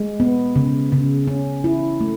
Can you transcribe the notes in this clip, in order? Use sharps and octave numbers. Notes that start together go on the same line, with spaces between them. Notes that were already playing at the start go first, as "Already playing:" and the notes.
Already playing: G#3
B3
C#3
C#3
C#4
E4
A3